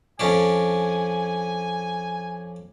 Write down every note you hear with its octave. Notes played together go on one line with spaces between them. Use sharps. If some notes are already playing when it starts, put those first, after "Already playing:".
F2 C#4 D4 G#5